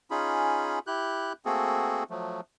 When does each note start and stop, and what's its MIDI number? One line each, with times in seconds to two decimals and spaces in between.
0.11 0.79 61
0.11 0.79 63
0.11 0.79 65
0.11 0.79 68
0.11 0.79 83
0.87 1.33 64
0.87 1.33 67
0.87 1.33 90
0.87 1.33 91
1.45 2.04 57
1.45 2.04 58
1.45 2.04 60
1.45 2.04 66
1.45 2.04 68
1.45 2.04 69
2.10 2.41 53
2.10 2.41 54
2.10 2.41 57